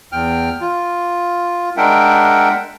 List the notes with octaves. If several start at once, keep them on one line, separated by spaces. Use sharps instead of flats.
E2 G5 F6
F4
G#3 D4 A#4 E5 F#5 G5